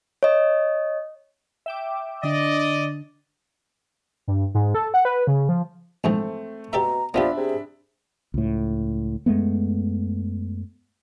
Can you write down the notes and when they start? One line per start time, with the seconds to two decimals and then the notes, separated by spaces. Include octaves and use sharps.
0.23 C#5 D#5
1.66 E5 G5 D6
2.23 D3 D4 D5 D#5
4.28 G2
4.54 G#2
4.75 A4
4.94 F#5
5.05 B4
5.27 C#3
5.49 F3
6.04 A#1 G#2 E3 A3 C4
6.73 B2 G4 D5 E5 A#5
7.14 F3 A#3 B3 D4 G4 D5 E5 B5
7.37 C3 G#4
8.34 C#2 A2
9.26 F#2 G#3 A3 B3